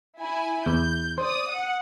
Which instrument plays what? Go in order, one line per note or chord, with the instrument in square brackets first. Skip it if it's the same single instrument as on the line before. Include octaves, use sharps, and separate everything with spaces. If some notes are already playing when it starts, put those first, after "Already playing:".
[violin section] E4 G#5
[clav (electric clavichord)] E2 [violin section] G6
[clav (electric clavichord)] C5 [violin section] D5 D#6
[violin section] F#5